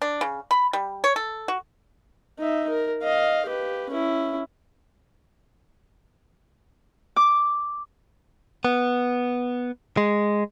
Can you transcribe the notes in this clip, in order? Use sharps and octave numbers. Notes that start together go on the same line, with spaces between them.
D4
C#3
B5
G3
C#5
A4
F#4
D#4 E5
A#4
D#5 F5
G4 B4
C#4 E4
D6
B3
G#3